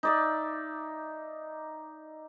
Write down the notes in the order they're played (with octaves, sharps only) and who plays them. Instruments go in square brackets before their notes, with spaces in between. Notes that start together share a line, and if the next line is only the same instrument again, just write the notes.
[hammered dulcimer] D#4 D5 E5